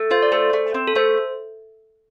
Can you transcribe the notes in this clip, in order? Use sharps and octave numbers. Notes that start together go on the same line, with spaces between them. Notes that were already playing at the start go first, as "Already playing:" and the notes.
Already playing: A3
F4 C5
D5
A3 C5
A3
C4
A4
A3 C5